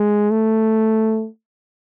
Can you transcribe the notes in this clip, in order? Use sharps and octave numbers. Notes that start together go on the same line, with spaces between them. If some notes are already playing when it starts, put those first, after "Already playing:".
Already playing: G#3
A3